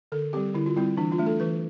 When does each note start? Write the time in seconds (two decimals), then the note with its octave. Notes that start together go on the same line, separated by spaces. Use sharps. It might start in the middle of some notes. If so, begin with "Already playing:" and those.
0.12 D3 A4
0.33 G3 C4 G4
0.55 D3 E4
0.66 F4
0.76 G3 C4 E4
0.97 E3 D4
1.12 F4
1.18 A3 D4
1.26 A4
1.40 E3 B4